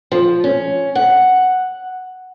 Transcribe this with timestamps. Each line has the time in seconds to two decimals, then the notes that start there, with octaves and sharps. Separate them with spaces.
0.12 F3
0.44 C#4
0.95 F#5